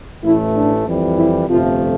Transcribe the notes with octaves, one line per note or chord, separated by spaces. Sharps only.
A1 A2 E3 A3 E4
D4
F2 E3 G3
E4
G1 F2 C3 F3 A3 F4